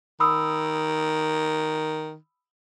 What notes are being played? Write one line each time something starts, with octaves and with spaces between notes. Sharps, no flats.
D#3 B5 D#6 E6